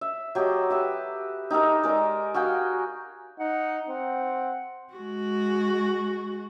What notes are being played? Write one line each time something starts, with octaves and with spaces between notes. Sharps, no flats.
E5
F#3 G4 A4 D#5
G4 B4 E5
D#4 G4 A4 A#4
G#3 A#4 D5
F#4 G#4 F5 G5
D#4 F#5
C4 F#5
G#3 F#4